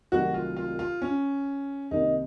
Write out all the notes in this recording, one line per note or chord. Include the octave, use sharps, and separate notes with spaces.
C2 C3 D#3 F#3 A3 F#4
F4
F4
F4
C#4
C2 C3 D#3 A#3 D#4